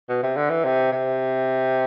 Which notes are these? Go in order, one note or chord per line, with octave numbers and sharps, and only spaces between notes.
B2
C3
D3
E3
C3
C3